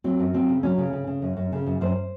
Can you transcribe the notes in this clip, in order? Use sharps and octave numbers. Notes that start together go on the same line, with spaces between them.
F#3 C4
F#2
F#3 C4
C#3
F#3 C#4
C#3
C#3
C#3
F#2
F#2
C#3
F#2
F#2 C5